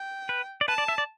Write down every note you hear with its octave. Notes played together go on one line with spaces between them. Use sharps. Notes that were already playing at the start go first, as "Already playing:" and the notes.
Already playing: G5
B4
D5
B4 A5
D5
E5
D5